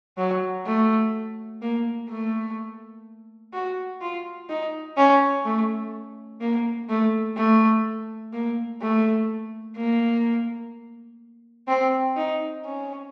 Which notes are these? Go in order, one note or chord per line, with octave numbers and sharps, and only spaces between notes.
F#3
A3
A#3
A3
F#4
F4
D#4
C#4
A3
A#3
A3
A3
A#3
A3
A#3
C4
D#4
C#4